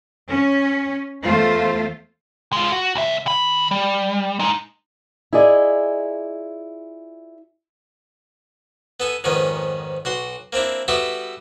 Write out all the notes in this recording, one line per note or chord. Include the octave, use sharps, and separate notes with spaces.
C#4
E2 A3 F4 C5
G#3 F4
F#4
C#2 E5
D#3 B5
G3
G#3 D#4
E4 F4 G#4 D5 D#5
B3 A4 G#5
F2 G#2 D#3 B3 C#4
B1 F#4 C6
A#3 C4 D4 E4
G3 B3 F#4 G4 A4 E5